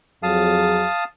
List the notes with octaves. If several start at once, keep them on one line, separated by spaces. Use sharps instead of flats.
F2 F#3 G#4 F5 A5 D#6